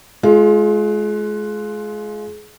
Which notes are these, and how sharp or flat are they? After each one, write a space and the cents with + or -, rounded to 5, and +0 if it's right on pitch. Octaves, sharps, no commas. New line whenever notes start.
G#3 +30 F4 +0 G#4 +10